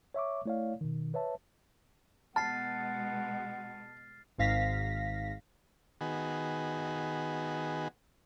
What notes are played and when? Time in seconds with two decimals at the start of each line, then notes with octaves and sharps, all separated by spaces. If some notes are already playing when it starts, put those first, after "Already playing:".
0.14 C#5 E5 C#6 D6
0.46 A3 E4 C#5 D5 F5
0.81 B2 D#3
1.14 B4 C#5 E5 A5
2.36 B2 G#3 F#5 A5 F6 A6 C7
4.38 G#1 G#2 F5 A#6 B6
6.01 D#3 B3 F#4 G#4